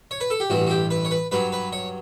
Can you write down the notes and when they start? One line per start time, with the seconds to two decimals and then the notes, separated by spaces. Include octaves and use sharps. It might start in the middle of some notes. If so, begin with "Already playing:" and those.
0.11 C#5
0.20 B4
0.30 A4
0.40 G4
0.50 A1 G2 E3 F#4
0.67 F#4
0.70 G4
0.90 B4
1.05 C#5
1.11 B4
1.31 G2 F#3 B4
1.52 B4
1.73 C#5